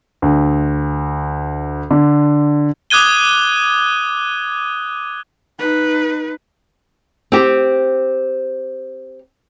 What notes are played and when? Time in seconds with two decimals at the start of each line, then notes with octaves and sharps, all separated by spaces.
0.22 D2
1.91 D3
2.90 D6 D#6 F#6 G#6 D#7 G7
5.59 D#4 B4
7.32 C4 G4